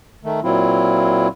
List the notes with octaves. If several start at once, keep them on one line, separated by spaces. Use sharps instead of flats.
D#3 A3
A#2 F#3 C4 E4 F4